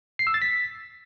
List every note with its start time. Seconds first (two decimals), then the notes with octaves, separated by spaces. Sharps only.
0.19 C7
0.27 E6
0.34 A6
0.42 B6